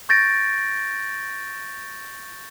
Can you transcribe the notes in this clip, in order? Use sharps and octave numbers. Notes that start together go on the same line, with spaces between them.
C#6 G6 A6 A#6 D7